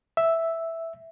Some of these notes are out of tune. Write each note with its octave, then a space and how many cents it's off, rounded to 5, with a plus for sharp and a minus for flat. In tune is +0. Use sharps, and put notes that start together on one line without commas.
E5 +0